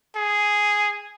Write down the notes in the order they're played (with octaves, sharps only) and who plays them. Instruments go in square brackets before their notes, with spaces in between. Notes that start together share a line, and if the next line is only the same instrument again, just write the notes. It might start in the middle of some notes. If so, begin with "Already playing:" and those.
[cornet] G#4